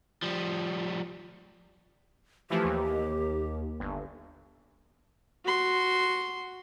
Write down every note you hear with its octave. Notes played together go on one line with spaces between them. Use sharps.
F3 G3
E3 F3 A3 G4
D#2
G1
F#4 C6